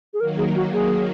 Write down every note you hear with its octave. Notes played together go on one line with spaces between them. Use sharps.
G#4
D#3 F#3 A#3 A#4
G#4
F#4
G#4